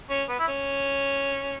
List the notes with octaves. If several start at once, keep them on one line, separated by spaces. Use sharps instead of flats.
C#4
B3
E4
C#4